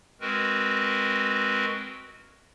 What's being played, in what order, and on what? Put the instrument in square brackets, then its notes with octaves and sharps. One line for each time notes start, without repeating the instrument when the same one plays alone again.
[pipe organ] G#3 C4 F#4 A#4 B4